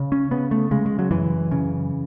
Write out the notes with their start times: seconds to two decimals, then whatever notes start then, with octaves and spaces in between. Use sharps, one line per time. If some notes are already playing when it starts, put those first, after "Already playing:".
Already playing: C#3
0.12 C#4
0.31 C#3 B3
0.51 A3
0.71 C#3 G#3
0.86 G#3
0.99 F#3
1.11 F#2 E3
1.51 C#3